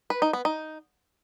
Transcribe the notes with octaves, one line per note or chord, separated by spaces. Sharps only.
B4
D#4
B3
D#4